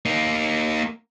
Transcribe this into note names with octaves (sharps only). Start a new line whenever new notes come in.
A#3 D#4